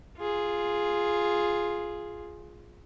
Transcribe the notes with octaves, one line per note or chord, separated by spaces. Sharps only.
F4 G#4